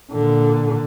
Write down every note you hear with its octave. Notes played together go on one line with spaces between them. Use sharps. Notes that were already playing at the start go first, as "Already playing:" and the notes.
A#2 D3